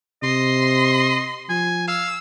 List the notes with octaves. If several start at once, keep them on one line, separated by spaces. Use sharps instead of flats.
C3 D#5 C6
F3 G#5
F5 E6